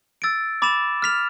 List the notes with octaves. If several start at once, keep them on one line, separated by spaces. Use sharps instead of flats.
E6 A6 D7
B5 D6 A6 E7
F6 B6 F7